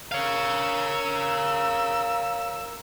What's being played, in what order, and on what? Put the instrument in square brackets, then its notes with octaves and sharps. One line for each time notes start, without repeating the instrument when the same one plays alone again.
[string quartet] A#4 E6 [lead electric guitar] C#5 F5